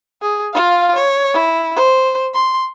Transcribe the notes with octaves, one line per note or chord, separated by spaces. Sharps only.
G#4
F4 F5
C#5
E4
C5
C6